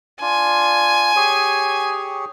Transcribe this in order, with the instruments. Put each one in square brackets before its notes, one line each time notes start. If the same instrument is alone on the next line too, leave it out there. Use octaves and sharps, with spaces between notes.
[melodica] D4 F4 [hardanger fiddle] G#5
[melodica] G4 G#4 C#5